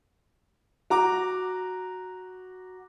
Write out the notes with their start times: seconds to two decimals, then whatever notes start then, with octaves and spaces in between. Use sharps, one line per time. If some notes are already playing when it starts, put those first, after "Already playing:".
0.90 F#4 A#5 D6